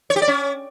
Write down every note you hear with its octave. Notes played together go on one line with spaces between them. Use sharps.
C#5
G4
D5
C#4